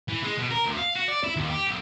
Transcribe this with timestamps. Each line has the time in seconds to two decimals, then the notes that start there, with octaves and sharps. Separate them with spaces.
0.08 E3
0.23 G#3
0.38 B2
0.51 A#4
0.65 D2
0.78 F5
0.95 F#4
1.08 D5
1.24 E4
1.36 D#2
1.50 G4
1.68 B1